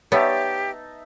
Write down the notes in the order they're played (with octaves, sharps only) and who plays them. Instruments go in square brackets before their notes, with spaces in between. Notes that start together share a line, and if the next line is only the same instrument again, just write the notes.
[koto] B3 [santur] D#4 E5 A5 [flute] G4 [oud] C#5